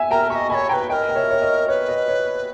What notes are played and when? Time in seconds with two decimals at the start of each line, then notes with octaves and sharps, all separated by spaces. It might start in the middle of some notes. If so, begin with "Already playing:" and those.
Already playing: E5 G#5
0.11 A#4 G5 A#5
0.30 D#5 E5 A#5 C#6
0.50 D#5 G#5 B5
0.55 C#5
0.69 C#5 G5 A#5
0.73 B4
0.89 A#4 B4 D#5 G5
1.09 G5
1.15 C#5 E5
1.31 C#5
1.42 D#5
1.68 B4 C#5
1.89 D#5
2.08 C#5